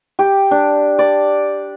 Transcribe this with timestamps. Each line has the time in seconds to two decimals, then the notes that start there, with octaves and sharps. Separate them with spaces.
0.19 G4
0.51 D4
0.99 D5